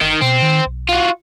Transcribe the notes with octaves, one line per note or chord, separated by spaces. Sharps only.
G1 D#3
B2 C4
D#3
B1
F4 F#4